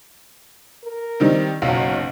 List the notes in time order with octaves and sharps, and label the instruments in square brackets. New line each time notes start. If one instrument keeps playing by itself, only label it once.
[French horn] A#4
[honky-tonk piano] D#3 G3 C4
[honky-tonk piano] F#1 B1 F5 [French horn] F#3